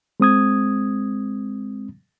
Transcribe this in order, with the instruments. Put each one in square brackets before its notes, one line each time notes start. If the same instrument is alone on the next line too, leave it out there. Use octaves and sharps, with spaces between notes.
[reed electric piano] G#3 C4 D#6 G#6